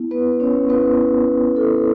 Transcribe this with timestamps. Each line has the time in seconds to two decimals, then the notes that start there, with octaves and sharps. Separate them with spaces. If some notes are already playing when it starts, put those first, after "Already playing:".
Already playing: B3 E4
0.11 B3 B4
0.40 C#4 C#5
0.69 B3 E4 B4
1.56 B3 E4 A4